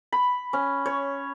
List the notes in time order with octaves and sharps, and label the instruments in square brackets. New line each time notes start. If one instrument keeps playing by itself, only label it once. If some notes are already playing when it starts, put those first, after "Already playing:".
[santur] B5
C#4
C#5